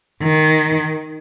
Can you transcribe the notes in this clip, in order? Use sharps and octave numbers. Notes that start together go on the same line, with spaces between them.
D#3